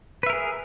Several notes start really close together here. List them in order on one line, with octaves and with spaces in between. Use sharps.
B4 E5 A#4 G#4